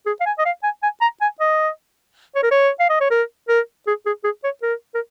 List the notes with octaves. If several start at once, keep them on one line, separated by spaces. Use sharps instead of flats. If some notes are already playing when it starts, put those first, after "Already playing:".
G#4
F5
G#5
D#5
F5
G#5
G#5
A#5
G#5
D#5
C#5
A#4
C#5
F5
D#5
C#5
A#4
A#4
G#4
G#4
G#4
C#5
A#4
A#4